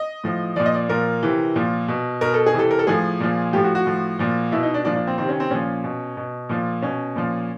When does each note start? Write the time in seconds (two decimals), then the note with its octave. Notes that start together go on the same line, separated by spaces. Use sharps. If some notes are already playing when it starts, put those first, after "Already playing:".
Already playing: D#5
0.24 A2 F3
0.56 A#2 F3 D5
0.66 D#5
0.75 D5
0.89 A#2 F3 A#4
1.23 C3 E3
1.56 A#2 F3
1.88 B2
2.21 B2 A#4
2.34 A4
2.46 G#4
2.54 C3 E3 A4
2.71 A#4
2.79 A4
2.87 A2 F3 G#4
3.20 A#2 F3
3.53 A2 F3 G4
3.64 F#4
3.75 F#4
3.86 A2 F3
4.19 A#2 F3
4.52 B2 E4
4.63 D#4
4.74 D4
4.85 A#2 F3 D4
4.96 D4
5.07 C4
5.18 C3 D#3 C4
5.29 C#4
5.40 C4
5.50 A#2 F3 C#4
5.84 B2
6.17 B2
6.49 A#2 F3
6.82 B2 C#4
7.16 A#2 F3